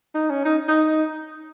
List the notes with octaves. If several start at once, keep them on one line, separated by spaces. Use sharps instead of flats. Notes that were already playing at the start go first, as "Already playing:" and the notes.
D#4
C#4
D#4
D#4